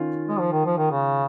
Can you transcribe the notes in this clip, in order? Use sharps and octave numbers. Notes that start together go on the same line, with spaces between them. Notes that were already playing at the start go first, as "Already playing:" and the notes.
Already playing: D#3 C#4 F4
G#3
F3
D#3
F3
D#3
C#3